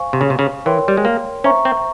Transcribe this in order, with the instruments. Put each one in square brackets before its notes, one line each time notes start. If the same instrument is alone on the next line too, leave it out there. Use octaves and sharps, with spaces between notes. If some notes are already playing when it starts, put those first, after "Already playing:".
Already playing: [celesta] C5 F5 G#5 C#6
[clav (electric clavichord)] C3
C#3
C3
C#3
[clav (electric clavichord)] E3 [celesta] A#4 C#5 G5 C6
[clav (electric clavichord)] G3
G#3
A#3
[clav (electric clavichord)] C#4 [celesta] C5 E5 A#5 C#6
[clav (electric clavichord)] C4